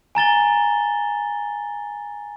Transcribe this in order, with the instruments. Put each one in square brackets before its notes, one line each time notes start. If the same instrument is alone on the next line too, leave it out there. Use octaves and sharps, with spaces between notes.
[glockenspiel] G#5 A#5 A6 G7